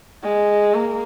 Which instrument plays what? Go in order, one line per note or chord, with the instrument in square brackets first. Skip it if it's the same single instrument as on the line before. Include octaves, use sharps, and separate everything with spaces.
[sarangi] G#3
A#3